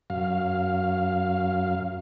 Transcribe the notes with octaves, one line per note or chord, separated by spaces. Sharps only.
F#2 F5